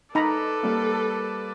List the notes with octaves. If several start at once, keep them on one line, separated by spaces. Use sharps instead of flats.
D#4 A4 B4 D5 A#5 B5
G3 A#3